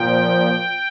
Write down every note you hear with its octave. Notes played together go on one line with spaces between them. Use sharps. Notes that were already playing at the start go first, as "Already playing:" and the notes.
Already playing: A#2 F3 G5